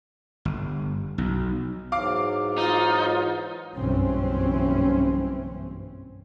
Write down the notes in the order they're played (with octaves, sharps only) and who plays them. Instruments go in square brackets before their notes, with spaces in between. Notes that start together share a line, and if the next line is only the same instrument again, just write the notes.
[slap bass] G1
B1
[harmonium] G#2 E3 F#3 [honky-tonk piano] F5 D6
[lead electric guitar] D#4 [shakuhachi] F4
[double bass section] F#1 B1 G2 E3 C4 C#4